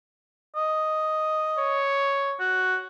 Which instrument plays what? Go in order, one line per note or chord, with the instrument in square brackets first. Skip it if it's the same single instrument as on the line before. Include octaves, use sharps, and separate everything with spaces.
[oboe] D#5
[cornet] C#5
[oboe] F#4